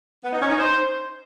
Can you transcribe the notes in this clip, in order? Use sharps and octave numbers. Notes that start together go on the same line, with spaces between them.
B3
D#4
C#4
D#4
C5